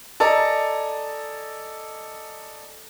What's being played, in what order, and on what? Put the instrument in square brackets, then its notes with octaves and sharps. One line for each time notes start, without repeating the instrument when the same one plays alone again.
[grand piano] A4 D5 D#5 G#5 A#5